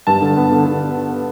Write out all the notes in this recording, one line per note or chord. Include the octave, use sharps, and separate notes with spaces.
G2 A5
D3
B3
D3
D3